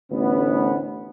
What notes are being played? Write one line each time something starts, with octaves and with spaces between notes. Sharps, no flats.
A1 D2 B3